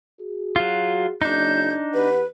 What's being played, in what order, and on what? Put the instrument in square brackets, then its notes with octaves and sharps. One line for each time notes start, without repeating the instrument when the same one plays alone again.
[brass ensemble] F#4 G#4
[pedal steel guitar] F#3 F4
[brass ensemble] F#1 [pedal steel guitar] D4 D#4 [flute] G6
[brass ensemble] E2 G4 F#5 [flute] B4